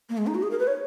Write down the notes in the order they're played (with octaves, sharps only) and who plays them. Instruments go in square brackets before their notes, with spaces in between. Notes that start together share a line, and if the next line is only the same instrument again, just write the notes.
[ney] A#3
G#3
D#4
F#4
G#4
A#4
B4
C#5